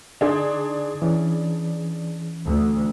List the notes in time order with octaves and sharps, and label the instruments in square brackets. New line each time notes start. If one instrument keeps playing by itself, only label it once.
[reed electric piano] D3 D#4 C6 [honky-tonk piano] D4 G#4
[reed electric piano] E3 C#4
[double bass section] D2